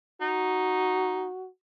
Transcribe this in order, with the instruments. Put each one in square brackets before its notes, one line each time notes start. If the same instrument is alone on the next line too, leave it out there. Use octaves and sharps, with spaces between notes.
[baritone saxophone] D#4 [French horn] F#4